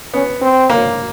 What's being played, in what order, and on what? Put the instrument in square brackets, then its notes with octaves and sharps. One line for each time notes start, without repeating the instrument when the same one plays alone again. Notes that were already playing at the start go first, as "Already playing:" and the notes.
[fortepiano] B3 [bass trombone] C#4
[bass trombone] C4
[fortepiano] A#3